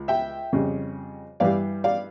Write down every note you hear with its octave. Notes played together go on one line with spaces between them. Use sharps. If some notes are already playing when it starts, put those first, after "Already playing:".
Already playing: C#2
E5 G5
F2 C#3 G3
G2 E3 G3 D5 F5
D5 F5